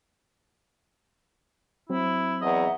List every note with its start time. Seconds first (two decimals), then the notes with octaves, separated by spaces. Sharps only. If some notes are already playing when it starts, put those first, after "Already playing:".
1.90 F#3 C4 E4
2.42 E2 D#5 E5 F#5 A#5